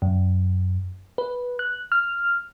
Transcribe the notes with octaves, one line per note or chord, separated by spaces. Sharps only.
F#2
B4
F#6
F6